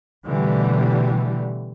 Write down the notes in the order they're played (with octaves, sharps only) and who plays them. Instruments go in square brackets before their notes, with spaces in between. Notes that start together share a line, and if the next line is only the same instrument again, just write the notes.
[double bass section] B2 D3 E3 G3 A3